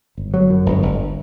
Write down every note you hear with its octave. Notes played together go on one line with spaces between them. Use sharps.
G1
F#3
F#2
G1
G1